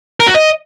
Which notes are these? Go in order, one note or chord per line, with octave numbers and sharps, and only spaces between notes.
A#4
F#4
D#5